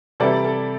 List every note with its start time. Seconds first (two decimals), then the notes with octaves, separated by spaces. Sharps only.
0.20 C3 E3 G3 E4 A4 D5
0.44 A4